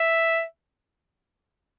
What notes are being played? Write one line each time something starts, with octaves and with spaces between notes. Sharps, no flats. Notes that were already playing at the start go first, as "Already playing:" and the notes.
Already playing: E5